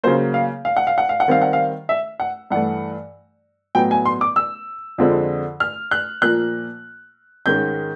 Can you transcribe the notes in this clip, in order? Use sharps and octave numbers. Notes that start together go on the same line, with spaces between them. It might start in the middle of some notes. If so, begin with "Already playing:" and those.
C#3 F#3 A#3 C5
F5
F5
F#5
F5
F#5
F5
F#5
D#3 G3 C4 F5
F#5
F5
E5
F#5
G2 E3 A3 F#5
A2 F#3 B3 G5
G#5
C6
D6
E6
F2 D3 F3 G#3 C4
F6
F#6
A#2 F3 A#3 F#6
G#2 D#3 G#3 C#4 G6